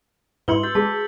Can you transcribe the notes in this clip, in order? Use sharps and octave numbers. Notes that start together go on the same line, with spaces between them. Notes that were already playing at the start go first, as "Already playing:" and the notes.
G#2 E4 B4 C6 C#7 F#7 G7
F#4 E6 G6 A6
G#3 G#4 A5 B6